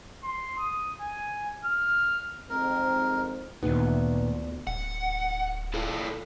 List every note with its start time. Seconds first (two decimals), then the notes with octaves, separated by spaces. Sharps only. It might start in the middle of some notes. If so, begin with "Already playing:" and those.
0.24 C6
0.58 D#6
1.01 G#5
1.65 F6
2.50 F2 G#2 C4 A#4
3.63 D2 A#2 D#3 B3
4.67 D1 F#5
5.74 E4 F4 A4